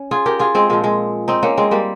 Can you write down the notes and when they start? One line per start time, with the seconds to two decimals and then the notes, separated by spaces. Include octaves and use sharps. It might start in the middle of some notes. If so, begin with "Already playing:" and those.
Already playing: C#4
0.11 F4 G#4
0.26 G4 A#4
0.39 F4 G#4
0.55 G#3 C4
0.70 A#2 F3 G#3
0.84 G#3
1.28 C4 D#4
1.43 A#3 C#4
1.57 G#3 C4
1.71 G3 A#3